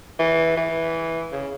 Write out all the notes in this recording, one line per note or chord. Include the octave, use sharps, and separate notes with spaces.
E3
E3
C#3